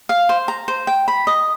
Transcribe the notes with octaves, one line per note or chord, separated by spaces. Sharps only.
F5
C5
A#5
C5
G5
B5
D#5